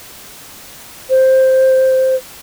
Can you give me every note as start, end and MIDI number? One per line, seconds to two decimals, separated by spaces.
1.10 2.15 72